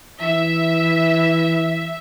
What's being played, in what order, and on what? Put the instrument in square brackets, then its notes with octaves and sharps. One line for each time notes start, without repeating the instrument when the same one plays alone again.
[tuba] E3 [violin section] E5